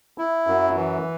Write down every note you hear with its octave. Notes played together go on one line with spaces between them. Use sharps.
E4
F#2
E3